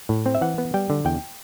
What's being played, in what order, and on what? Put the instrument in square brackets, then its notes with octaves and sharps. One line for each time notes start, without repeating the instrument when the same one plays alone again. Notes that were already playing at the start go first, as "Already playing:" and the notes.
[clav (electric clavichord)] A2
C4
E5
E3 F#5
B3
G3 G5
D3
E2 G5